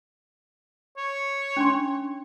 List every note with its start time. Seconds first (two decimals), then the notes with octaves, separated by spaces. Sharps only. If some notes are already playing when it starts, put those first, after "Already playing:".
0.97 C#5
1.57 C#4 D4 C6